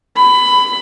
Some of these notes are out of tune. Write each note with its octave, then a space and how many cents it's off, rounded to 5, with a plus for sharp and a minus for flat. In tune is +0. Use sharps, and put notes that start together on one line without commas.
B5 +15